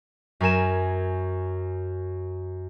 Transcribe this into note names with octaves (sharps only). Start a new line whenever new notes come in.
F#2 A#4 G#5 E7